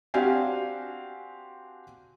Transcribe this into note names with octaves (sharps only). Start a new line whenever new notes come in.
C4 D4 F#4 G4 F5 G#5